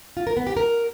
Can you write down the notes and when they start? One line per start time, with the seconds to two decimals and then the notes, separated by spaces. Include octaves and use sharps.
0.17 F4
0.27 A#4
0.37 B3
0.47 G4
0.57 A#4